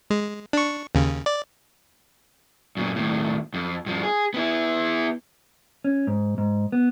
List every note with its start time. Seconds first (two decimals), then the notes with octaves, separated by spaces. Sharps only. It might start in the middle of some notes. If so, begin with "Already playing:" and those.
0.10 G#3
0.53 D4 C#6
0.95 D#2 C#3
1.26 D5
2.77 F#2 A#2
2.96 D#2 A2
3.54 F2
3.86 G2 F3
4.03 G#4
4.34 B3 E4
5.84 C#4
6.07 G#2
6.38 G#2
6.72 B3